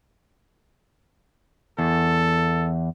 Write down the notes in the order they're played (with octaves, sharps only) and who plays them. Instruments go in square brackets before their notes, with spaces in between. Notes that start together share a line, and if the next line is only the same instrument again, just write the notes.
[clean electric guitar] E2 [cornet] A4